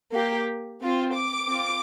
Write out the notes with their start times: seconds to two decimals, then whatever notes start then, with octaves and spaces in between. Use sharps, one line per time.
0.14 A#3 G4
0.81 C4 F4
1.15 D6
1.48 C4 F4